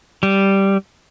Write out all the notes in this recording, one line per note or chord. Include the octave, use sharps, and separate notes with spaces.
G3